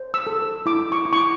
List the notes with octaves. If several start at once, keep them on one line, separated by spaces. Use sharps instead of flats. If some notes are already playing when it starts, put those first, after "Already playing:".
Already playing: C5
E6
A4
E4 D6
C#6
E4
C#6
D6